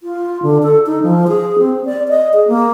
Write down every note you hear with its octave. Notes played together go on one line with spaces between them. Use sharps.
F4
D3
A4
D#4
F3
G#4
C4
D5
D#5
G#4
A#3